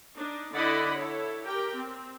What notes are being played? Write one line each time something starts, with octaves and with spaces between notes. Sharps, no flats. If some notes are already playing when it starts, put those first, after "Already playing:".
D4 D#4
D3 E4 D5 D#5 F#5 B5
E4 A4 C#5
G4 A#4 G5
C4